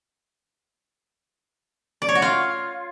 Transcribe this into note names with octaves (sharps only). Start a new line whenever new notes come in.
D5
C#5
F#4
F4